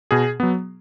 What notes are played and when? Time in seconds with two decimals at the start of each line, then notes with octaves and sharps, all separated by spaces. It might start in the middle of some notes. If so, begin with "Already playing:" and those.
0.11 B2 G#4
0.40 F#3 B3